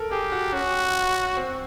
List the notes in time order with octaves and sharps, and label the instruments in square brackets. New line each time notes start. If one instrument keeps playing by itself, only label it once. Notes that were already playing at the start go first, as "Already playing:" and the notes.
Already playing: [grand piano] A4 A#4
[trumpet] G4 [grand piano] G#4
[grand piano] F#4
[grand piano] C#4 [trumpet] F#4
[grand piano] C4